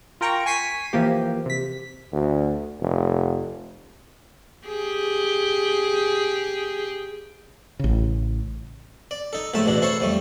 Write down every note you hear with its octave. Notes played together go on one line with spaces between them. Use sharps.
F4 A#4 G5 A#5 C#6
G#5 C#6 B6 C7 D#7
E3 F3 A#3 G4
C3 B6
D2
F1
G4 G#4
A1 C#3
D5
D#4 A4
A#1 A2 A3 E5 A5
A1 E2 B2 D4
E4 A4 C5 C#5 A5
F2 G3 A3